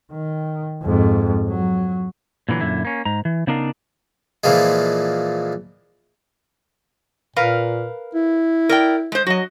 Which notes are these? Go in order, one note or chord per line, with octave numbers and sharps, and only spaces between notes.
D#3
F2 G#2
F#3
A#2 D3 E3 F#3
F#2 A#2 D3 E4
A#3 C#4
G#2 A#5
E3
C#3 B3 D4 D#4 A#4 F5
A#2 E3 F3 G#3
A#2 A#4 B4 F5
E4
A#4 D5 G5
G#3 C5
F#3 F#4 D#5